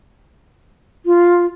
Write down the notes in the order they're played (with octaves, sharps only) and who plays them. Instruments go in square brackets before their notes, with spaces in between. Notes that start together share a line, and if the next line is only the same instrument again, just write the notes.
[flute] F4